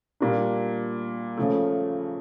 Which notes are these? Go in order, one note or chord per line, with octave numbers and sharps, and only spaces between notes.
A#2 G3 A#3 D4
C#3 F3 A3